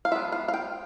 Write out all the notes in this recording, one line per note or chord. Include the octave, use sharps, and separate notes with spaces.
F5
F3 B3 D4 E5
F5
F5
G5